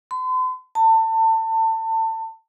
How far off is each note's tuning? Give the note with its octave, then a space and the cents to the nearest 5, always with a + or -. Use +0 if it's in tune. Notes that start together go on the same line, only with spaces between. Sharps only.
C6 -45
A5 +30